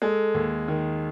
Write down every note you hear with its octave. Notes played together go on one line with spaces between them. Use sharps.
G#3 A4
D#2
D#3